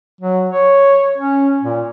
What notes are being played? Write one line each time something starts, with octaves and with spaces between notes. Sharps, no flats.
F#3
C#5
C#4
A#2